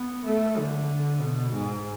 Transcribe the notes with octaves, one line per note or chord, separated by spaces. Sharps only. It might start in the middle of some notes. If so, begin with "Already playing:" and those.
Already playing: B3
A3
D3
B2
G#2